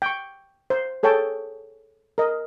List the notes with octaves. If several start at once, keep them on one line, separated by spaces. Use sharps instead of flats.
G5 C#6
C5
G#4 A4 C#5 G5 A5
A#4 D#5